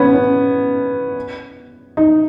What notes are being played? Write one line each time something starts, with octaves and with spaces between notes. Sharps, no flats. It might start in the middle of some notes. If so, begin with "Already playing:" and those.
Already playing: B3 C#4
C#4
D#4